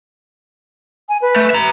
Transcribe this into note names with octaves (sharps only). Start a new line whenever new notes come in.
G#5
B4
A3
E5 A#5